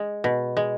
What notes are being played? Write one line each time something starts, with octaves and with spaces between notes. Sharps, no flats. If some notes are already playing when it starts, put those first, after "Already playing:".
Already playing: G#3
B2
G#3